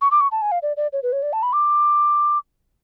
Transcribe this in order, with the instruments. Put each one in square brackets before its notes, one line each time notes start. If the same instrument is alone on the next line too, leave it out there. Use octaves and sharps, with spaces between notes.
[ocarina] C#6
D6
C#6
A5
G#5
F5
D5
D5
C#5
B4
C#5
D5
A5
B5
D6